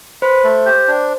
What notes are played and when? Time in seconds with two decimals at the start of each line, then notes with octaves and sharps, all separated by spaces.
0.22 B4 C5
0.44 A3
0.66 G4
0.88 D4